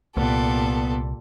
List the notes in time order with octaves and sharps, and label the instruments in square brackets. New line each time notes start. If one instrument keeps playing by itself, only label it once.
[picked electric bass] C2 [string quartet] A#2 G3 A4 [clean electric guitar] B3